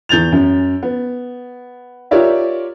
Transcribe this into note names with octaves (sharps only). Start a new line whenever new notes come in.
E2 G6 A6 F7
F#2
B3
F4 G4 A#4 C#5 D5 E5